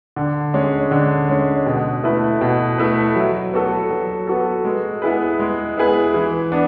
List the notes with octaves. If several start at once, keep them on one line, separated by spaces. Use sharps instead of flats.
D3
G#3 C#4
D3
G#3 C#4
B2
A3 E4 B4
B2
A3 E4 B4
F#3
B3 F#4 A4
F#3
B3 F#4 A4
G#3
B3 E4 G#4 B4
G#3
B3 E4 G#4 B4
E3
B3 D4